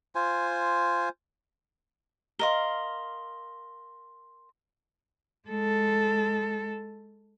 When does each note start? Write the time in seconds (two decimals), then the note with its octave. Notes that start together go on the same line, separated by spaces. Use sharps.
0.15 F4 C5 G#5
2.39 A#4 D#5 F5 C6 G7
5.48 G#3 A4